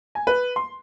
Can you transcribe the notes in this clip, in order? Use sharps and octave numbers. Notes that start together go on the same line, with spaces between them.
G#5
B4
C6